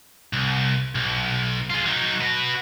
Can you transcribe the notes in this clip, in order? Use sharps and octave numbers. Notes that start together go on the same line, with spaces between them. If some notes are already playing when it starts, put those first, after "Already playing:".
C2
B1
F4 G#4
F#3 D#4
F#4 B4